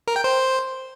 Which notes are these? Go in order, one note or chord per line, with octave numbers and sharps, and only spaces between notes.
A#4
G5
C5